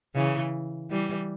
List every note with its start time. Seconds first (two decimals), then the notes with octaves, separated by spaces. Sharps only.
0.16 C#3 E3
0.91 E3 G3